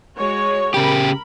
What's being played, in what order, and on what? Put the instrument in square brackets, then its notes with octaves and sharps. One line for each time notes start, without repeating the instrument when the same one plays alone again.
[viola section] G#3 F#4 C#5
[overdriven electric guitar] C#3 G4 [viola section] A#4 B5